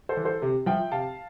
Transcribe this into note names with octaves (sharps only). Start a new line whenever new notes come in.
A4 C5
E3
A4 C5
C3
F3 E5 G5
C3 F5 A5